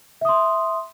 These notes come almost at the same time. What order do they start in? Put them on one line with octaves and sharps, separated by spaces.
E5 D#6 C6